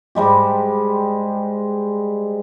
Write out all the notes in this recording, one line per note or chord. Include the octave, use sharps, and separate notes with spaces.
G#2 G3 G#3 G4